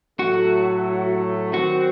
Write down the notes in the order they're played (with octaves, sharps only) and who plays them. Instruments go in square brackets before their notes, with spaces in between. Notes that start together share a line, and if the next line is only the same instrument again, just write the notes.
[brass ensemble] A2 F#3 A3 [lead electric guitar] F#4
[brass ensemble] D#3 F#3 C4 [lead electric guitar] F#4